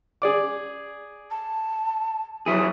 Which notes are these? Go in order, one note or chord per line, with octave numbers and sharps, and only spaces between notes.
G#4 D5 D6
A5
F#3 E4 G#4 D#6